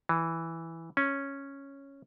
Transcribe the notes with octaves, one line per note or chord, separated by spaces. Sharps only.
E3
C#4